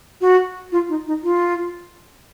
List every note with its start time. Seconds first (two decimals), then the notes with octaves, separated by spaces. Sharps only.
0.21 F#4
0.72 F4
0.89 D#4
1.07 D#4
1.23 F4